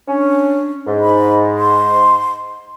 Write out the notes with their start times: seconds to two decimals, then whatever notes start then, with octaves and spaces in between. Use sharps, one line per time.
0.08 C#4 D4
0.87 G#2
1.00 B5
1.57 C6